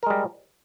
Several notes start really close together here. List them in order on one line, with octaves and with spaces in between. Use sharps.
A#4 G#3 G3